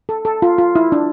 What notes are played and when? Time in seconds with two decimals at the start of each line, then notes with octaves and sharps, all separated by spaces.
0.09 A4
0.25 A4
0.42 F4
0.58 F4
0.76 E4
0.92 D4